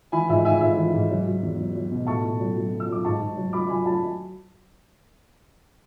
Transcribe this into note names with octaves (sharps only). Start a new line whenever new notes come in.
E3 G#5 B5
G#2 E5 G#5
G#2 E5 G#5
G#2 E5
E3
G#2
F#3
F#3
E2
F#3
F#3
B2
A2 A5 C#6
A2
F#3
F#3
F#3
E6
F#3 D6
G#2 A5 C#6
G#2
F#3
F#3 B5 D6
F#3 G#5 B5
F#3 A5
B5